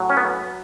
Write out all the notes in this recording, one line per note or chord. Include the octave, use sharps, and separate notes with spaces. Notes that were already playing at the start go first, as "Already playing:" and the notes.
Already playing: A2 F#3
C#4
B3